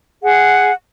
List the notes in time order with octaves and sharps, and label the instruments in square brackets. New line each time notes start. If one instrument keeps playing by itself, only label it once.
[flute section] G#4 F#5